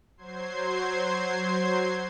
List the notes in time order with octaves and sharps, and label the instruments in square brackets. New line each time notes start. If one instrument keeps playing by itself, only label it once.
[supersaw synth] F#3 C5 C6 G#6 C7